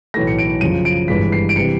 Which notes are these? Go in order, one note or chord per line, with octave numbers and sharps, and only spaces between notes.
B1 A2 E3 A3 A#6
C#7
D7
F#2 C#3 F3 D#7
D7
G1 G2 E3 G#3 B6
C7
D7
C3 E3 G3 C#7